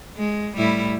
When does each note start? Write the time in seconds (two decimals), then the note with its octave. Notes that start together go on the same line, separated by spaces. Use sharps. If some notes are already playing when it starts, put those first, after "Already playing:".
0.18 G#3
0.57 A2 G3 E4